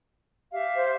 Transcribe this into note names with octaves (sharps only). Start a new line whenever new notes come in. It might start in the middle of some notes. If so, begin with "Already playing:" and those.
G4 E5 F5
C5